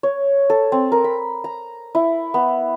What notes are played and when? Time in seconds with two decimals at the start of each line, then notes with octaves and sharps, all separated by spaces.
0.03 C#5
0.50 A4
0.72 C4
0.92 A#4
1.04 B5
1.44 A#5
1.95 E4
2.34 B3